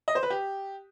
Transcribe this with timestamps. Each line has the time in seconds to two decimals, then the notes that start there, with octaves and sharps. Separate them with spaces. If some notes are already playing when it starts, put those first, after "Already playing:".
0.08 D#5
0.15 C5
0.23 B4
0.30 G4